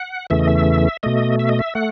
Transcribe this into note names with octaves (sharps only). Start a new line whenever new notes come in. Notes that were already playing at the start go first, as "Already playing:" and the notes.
Already playing: F#5
E2 C#3 E3 A3 E5
D#5
E5
B2 A3 D#5
E5
D#5
E5
A3 F#5